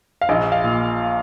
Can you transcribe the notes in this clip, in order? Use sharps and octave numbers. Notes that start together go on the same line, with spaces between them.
F5
A#1 D#5
F5
A#2